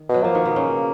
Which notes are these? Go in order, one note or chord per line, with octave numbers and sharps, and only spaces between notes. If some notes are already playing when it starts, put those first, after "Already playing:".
Already playing: D#3
B2 F#3
F3 A#3
D#3
B2 B3
C#3 C#4